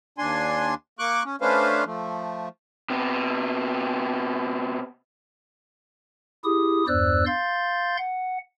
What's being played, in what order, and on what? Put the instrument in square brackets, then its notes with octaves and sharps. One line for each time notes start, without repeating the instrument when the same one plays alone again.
[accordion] D#2 D4 G#5 C6
A#3 C#6 D6 F#6
C#4
A3 C#4 D4 B4 C5 F5
F3 A3
[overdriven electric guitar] C3 B3
[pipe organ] E4 G4 G#4 D#6
E2 G2 C5 D5 E6 F#6
F5 C6 G6 A6
F#5